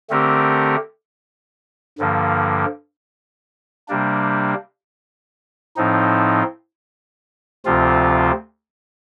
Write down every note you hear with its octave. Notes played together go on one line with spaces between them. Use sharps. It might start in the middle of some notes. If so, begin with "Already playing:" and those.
D3 A3 C4 G4 A#4
G2 D3 F3 A#3
C3 G3 A#3 D4
A2 F3 C4 D#4
D2 C3 F3 C4 F4